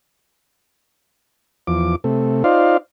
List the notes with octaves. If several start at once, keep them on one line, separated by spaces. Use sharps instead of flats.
E2 F3 D6
C3 A3
D#4 F4 C5 D5 F5